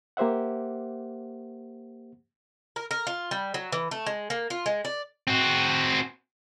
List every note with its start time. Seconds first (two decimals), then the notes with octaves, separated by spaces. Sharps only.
0.17 A#3 G4 C5 E5 F#5
2.76 A#4
2.91 A#4
3.07 F4
3.31 G3
3.54 F#3
3.72 E3
3.91 A3
4.06 G#3
4.30 A#3
4.50 F4
4.66 G#3
4.85 D5
5.27 C4 F#4